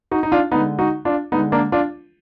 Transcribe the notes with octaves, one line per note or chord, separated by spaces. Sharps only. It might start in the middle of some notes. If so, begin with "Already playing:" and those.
D#4 F#4
D#4
D4 F4
D3 G#3 B3 D#4
D#4 F#4
D4 F4
D3 G#3 B3 D#4
A#3 D4
D4 F4